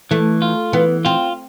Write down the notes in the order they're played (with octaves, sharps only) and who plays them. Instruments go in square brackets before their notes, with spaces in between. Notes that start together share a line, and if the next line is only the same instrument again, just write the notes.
[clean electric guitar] E3 [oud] A3
[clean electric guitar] F4
[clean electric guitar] E3 [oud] B3
[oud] C4 [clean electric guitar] F4